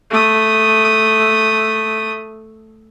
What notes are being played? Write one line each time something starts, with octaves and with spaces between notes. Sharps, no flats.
A3 D#6